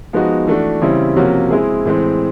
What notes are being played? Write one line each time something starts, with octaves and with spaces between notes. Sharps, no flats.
F3 G#3 B3 D#4 F#4
E3 A3 D4 F#4
C#3 E3 G3 C4 E4
C3 F3 A#3 C#4 F#4
G#3 C4 E4 G#4
A2 E3 G#3 C4